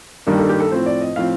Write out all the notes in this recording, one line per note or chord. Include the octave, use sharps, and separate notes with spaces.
G2 D#3 G3 A#3 D4
A4
G4
A4
A2 F3 C4 C5
D5
D#5
A2 F3 C4 F5